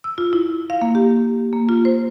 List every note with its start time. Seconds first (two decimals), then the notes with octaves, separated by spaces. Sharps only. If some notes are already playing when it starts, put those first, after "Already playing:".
0.04 E6
0.18 F4
0.33 E4
0.70 F5
0.82 A#3
0.95 G4
1.53 A#3
1.69 F4
1.85 C5